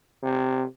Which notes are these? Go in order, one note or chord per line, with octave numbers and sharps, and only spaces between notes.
C3